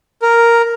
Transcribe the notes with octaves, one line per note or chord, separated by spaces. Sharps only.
A#4